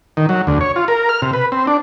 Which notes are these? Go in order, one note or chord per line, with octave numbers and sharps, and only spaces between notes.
D#3
F#3
D2
C#5
F4
A#4
F6
C3
B4
C4
D4